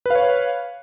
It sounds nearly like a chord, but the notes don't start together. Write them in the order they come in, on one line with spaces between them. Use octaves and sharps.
B4 F5 C#5